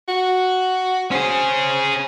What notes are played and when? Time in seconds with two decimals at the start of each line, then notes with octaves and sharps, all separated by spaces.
0.08 F#4
1.11 C#4 G#4 C5